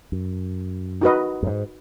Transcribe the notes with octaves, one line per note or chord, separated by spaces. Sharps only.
F#2
D#4 F#4 B4 D#5
F#2
G#2